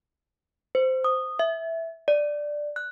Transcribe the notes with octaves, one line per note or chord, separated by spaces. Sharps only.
C5
D#6
E5
D5
F#6